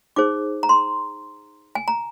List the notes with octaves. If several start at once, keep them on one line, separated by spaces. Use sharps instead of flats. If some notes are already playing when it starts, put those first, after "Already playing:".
D#4 G#4 C5 D6
A#5
C6
G#5
A#5